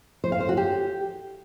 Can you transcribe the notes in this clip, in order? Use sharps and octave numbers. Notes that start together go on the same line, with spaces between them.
C5
F5
C5
F#4
G4